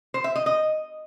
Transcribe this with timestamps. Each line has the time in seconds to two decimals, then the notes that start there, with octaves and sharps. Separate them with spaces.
0.14 C5
0.24 E5
0.36 D#5
0.46 D#5